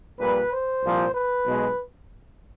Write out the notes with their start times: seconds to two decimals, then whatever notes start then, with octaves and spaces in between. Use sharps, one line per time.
0.18 A#1 A#2 G3 B4
0.51 C5
0.83 C2 A#2 F3
1.14 B4
1.45 B1 B2 G#3